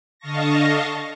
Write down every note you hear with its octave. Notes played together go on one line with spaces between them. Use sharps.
D3 D#5 F5 A5 C#6 A#6